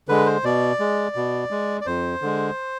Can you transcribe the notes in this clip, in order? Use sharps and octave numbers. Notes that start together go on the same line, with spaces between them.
D3 G#3 B4
C5
B2 D5
G#3
B2
G#3
D5
F2 C5
D3 G#3